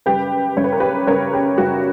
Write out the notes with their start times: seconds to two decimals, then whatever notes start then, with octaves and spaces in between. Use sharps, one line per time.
0.06 F#2 C#3 G3 G4 B4
0.57 F#2 C#3 G3 C#5
0.64 B4
0.72 A#4
0.80 G4 B4
1.07 F#2 C#3 G3 A#4 C#5
1.33 G4
1.58 F#2 C#3 G3 F#4